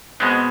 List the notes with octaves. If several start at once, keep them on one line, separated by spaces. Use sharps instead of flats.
B2 G#3 B3 C4